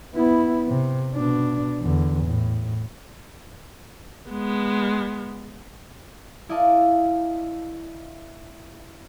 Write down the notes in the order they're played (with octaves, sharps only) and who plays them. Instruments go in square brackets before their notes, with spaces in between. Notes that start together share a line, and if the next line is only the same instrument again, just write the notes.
[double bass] B3 E4
C3
B2 D4
E2 D3
A2
[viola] G#3 B3
[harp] E4 D5 D#5 F5 A5